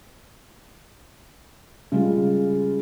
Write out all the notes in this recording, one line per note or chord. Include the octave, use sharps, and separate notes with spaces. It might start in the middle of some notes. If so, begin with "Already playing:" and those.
C#3 G3 G#3 F4